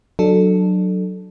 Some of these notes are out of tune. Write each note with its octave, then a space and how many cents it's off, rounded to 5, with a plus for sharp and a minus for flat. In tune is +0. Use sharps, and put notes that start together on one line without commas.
F#3 +0 D4 +30 A4 +0